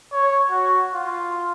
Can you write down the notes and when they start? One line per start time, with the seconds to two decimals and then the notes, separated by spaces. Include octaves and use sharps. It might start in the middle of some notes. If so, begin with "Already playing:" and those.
0.12 C#5
0.50 F#4
0.94 F4